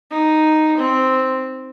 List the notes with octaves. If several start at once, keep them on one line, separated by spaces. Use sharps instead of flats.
D#4
C4